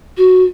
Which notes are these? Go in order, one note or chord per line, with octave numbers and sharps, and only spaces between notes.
F#4